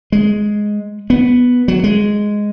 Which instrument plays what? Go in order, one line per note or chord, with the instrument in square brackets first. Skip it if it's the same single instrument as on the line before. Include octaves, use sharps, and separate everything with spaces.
[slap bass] G#3
B3
F#3
G#3